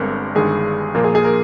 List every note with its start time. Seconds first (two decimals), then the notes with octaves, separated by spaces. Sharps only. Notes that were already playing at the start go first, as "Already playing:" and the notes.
Already playing: G1 G2 D3 G#3 C4 A#4
0.35 G1 G2 D#3 G#3 G#4
0.94 A#2 F3 A#3 F4 A#4
1.04 G#4
1.15 G#4
1.24 A#4